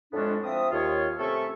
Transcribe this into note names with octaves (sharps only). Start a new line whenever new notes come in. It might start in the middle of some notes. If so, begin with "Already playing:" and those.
F2 A2 G#3 B3 C#4 D4
F3 C4 E5 D#6
D#2 F4 C#5
C3 A3 C#4 A4 E5 C#6